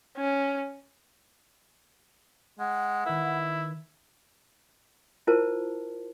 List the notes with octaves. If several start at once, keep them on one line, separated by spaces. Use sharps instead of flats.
C#4
G#3 F#5
D#3 E4 B4
E4 F4 A#4 C5 A5